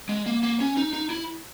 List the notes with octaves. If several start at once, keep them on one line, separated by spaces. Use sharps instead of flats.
G#3
A#3
A#3
C#4
D#4
D#4
E4